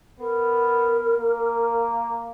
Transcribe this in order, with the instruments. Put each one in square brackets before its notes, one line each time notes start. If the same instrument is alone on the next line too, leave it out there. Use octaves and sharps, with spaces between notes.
[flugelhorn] B3 [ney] A#4
[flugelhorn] A#3